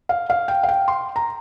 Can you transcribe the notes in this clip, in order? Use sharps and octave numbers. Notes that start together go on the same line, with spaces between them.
F5
F5
G5
F5
G5
C6
A#5